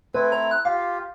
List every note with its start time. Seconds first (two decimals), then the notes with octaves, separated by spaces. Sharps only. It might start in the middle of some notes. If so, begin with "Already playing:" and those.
0.14 A3 C4 E4 B4
0.32 A#5
0.51 F#6
0.65 F4 G4 F5